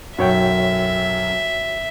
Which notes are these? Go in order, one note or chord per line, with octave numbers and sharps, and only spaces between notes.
B1 F#2 F#4 C#5 E5 G5